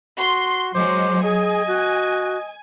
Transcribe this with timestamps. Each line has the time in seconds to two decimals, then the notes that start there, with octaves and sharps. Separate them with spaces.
0.18 F#4 C6
0.75 F#3 G#3 C5 D6
1.23 G#4 D#5 G#5
1.68 F#4